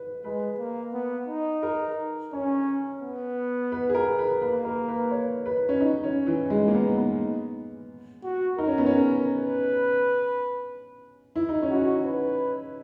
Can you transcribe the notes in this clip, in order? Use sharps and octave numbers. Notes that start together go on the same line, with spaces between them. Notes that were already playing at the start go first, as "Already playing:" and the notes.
Already playing: B4
G#3 B4
A#3
B3
D#4
A#4
C#4 C#5
B3
B4
G#4
A#4
B4
A#3 B4
B4
A#4
B4
C#5
B4
C#4
B3 D#4
C#4
E3
G#3 D#4
A#3
B3
B3
F#4
D#4 A#4
C#4
B3
C#4
A#4
B4
E4
D#4
C#4
D#4 F#4
B4